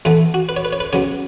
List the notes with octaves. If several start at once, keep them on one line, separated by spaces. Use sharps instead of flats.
A2 E3 B3 A4
F#4
B4
C#5
B4
C#5
B4
C#3 F#3 B3 C#5